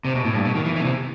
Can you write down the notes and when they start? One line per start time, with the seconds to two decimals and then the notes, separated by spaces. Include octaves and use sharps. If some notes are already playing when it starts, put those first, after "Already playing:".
0.05 C3
0.15 B2
0.25 A2
0.35 G2
0.45 B2
0.55 D#3
0.65 E3
0.76 E3
0.80 B2
0.85 C3